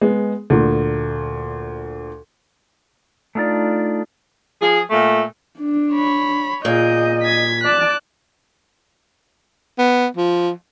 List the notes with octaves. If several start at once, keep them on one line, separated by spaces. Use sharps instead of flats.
G#3 B3
D2 A#2
A3 D4 D#4 F4 D5
F3 G#4
A#2 A3
D4
C#5 B5
A#2 G#4 D#5 G6
G#6 B6
D5 A5 F#6
B3
F3